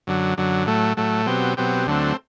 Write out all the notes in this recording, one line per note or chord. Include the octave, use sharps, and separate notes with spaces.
F#2 D3 F#3
F#2 D3 F#3
A2 F#3 A3
A2 F#3 A3
B2 F#3 C4 G4
B2 F#3 C4 G4
D2 D3 F#3 A3 C4